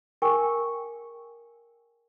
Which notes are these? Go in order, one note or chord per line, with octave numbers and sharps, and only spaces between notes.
G#4 A#4 G5 G#5 C#6